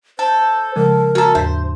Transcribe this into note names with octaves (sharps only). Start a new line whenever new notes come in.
A4 C5
C#3 F3 G#3 A#4
C#4 F#4 A4 A#5
D#2 G#2 C5